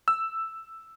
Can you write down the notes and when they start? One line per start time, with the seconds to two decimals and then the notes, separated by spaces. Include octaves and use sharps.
0.08 E6